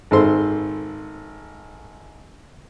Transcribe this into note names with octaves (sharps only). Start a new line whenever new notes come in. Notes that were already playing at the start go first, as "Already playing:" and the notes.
G#1 A4 C5 C6